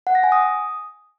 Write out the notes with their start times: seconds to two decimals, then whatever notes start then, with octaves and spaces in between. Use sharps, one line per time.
0.07 F#5
0.15 A#6
0.24 G#5
0.32 D#6